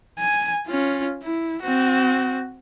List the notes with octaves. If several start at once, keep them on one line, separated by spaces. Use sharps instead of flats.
G#5
C#4 F4
E4
C4 F#4